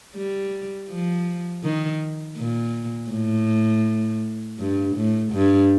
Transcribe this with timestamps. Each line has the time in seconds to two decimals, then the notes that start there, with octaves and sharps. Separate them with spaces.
0.15 G3
0.89 F3
1.64 D#3
2.37 A#2
3.11 A2
4.59 G2
4.96 A2
5.33 G2